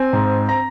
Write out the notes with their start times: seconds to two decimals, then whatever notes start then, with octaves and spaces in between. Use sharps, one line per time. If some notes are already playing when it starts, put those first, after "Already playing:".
Already playing: C4 G#5
0.13 G#2
0.49 A#5